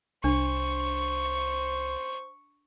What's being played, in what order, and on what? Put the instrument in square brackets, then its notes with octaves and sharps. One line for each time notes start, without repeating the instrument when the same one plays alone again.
[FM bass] C2 [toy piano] D4 [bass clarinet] C5 [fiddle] C#6